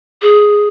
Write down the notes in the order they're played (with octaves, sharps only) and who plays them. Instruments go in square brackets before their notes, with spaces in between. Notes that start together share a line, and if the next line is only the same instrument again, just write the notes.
[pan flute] G#4